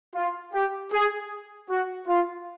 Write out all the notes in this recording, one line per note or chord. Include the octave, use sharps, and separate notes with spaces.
F4
G4
G#4
F#4
F4